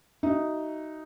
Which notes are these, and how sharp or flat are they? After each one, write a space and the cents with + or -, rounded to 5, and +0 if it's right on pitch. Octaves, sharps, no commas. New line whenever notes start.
D#4 +0 F#4 +30 E5 +0